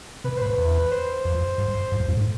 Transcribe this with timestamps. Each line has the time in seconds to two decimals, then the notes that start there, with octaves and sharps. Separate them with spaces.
0.24 C3 B4
0.37 C5
0.41 A2 B4
0.58 E2
0.92 C5
1.25 F2
1.58 G2
1.92 G2
2.00 F2
2.08 G2
2.17 A2